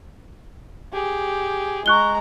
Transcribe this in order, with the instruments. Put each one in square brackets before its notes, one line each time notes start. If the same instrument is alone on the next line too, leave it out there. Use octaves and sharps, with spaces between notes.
[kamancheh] G4 G#4
[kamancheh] G#3 A#5 [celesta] C#6 F#6 G7